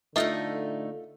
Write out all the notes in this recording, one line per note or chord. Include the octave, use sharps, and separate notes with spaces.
A2 D3 A3 D#4 F4 D#5 E5